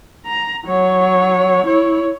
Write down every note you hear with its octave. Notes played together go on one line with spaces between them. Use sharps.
A#5
F#3 C#5
E4 C#5